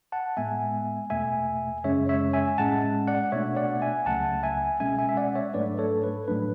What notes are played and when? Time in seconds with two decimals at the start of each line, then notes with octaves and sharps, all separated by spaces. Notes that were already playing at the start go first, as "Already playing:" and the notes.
0.12 F#5 A5
0.37 A2 G#3 B3 E5 G#5
1.10 E2 B2 A3 E5 G#5
1.84 F#2 C#3 G#3 C#4 C#5 E5
2.09 C#5 E5
2.33 E5 G#5
2.58 A2 G#3 C#4 F#5 A5
3.08 D5 F#5
3.32 B2 A3 D4 C#5 E5
3.57 D5 F#5
3.82 E5 G#5
4.06 C#2 C#3 F#3 A3 F#5 A5
4.43 E5 G#5
4.80 B2 G#3 C#4 E5 G#5
4.99 E5 G#5
5.09 E5
5.17 D5 F#5
5.35 C#5 E5
5.54 G#2 F#3 A3 D4 B4 D5
5.79 A4 C#5
6.03 B4
6.28 A2 F#3 A3 D4 B4